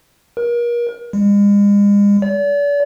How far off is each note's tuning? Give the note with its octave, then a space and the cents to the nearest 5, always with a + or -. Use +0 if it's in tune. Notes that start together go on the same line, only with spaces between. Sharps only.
A#4 +35
G#3 -40
D5 -40